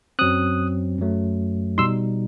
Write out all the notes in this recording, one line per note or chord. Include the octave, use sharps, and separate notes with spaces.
F#2 F#3 C4 D#6 F#6
F#2 F#3 A3
B2 G3 D#4 C6 E6